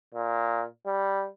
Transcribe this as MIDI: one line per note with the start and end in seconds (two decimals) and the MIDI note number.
0.14 0.64 46
0.86 1.27 55